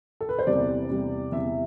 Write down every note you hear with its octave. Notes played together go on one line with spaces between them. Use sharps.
A4
B4
C5
E2 C3 G3 D5
E2 C3 G3
E2 C3 G3 E5